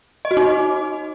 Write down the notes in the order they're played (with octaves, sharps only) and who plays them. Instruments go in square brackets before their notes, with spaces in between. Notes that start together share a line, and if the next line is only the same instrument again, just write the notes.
[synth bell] D#5
F#4
D#4